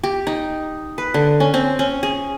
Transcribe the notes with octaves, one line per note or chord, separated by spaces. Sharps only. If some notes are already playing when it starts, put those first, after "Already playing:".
G4
D#4
B4
D3
C#4
C4
C#4
G#4